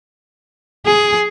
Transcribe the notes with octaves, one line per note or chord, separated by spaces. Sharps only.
G#4